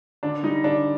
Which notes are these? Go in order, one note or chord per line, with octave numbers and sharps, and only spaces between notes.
D3 D4
G3 D#4
D3 D4